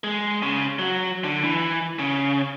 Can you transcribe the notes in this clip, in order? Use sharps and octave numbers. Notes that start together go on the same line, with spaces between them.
G#3
C#3
F#3
D3
E3
C#3